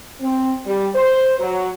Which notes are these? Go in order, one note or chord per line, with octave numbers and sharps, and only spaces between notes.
C4
G3
C5
F#3